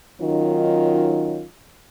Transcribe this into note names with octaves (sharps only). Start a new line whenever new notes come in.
D#3 F#3 C#4 D#4 F4